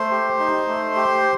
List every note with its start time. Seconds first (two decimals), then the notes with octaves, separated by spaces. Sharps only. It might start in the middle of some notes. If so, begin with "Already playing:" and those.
Already playing: A3 C5 C6
0.11 G4
0.39 D#4
0.68 A3
0.96 G4